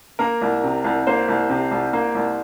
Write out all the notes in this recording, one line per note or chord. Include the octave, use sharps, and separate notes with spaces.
A#3 A#4
C2
C3
C2
A#3 C5
C2
C3
C2
A#3
C2